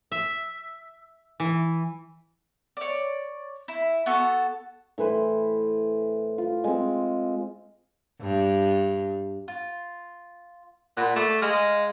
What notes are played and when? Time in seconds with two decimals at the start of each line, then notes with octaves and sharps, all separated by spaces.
0.12 E5
1.40 E3
2.77 C#5 D5
3.68 E4
4.06 B3 F#4 A4
4.98 A2 E3 B4 C5
6.38 F4
6.64 G#3 C4
8.21 G2
9.48 F4
10.97 A#2 F#5 B5
11.16 A3 D5 D6
11.42 G#3 D#5 F5 F6